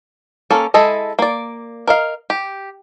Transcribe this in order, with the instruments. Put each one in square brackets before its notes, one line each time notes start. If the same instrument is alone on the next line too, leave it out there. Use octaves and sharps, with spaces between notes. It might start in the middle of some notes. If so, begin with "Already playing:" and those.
[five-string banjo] A#3 C#4 A4
G#3 E4 A4 D#5
A#3 D5
A#4 D#5 F5
G4